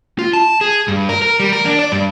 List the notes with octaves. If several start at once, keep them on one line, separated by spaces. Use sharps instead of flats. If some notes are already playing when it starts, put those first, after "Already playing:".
F4
A5
G#4
G2
A#4
A#4
G3
A#4
D4
D5
G2